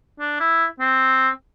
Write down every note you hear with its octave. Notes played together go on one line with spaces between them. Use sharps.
D4
E4
C4